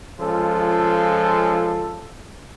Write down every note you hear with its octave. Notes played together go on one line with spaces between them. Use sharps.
F3 G#3 C#4 F4 A4